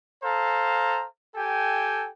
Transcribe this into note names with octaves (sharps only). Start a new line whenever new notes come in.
A4 C5 F5 A#5
G4 A4 G5 G#5